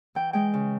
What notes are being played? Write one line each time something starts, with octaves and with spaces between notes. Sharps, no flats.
E3 G5
G#3 G5
C#3